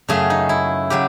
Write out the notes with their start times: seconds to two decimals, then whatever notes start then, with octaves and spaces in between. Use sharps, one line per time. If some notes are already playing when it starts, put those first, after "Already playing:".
0.09 F#2 C#3 F#3 A3 G#4
0.30 D#4
0.49 E4
0.90 C#3 F#3 G4